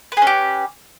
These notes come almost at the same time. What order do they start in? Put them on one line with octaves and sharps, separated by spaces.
B4 G#4 C#4 G4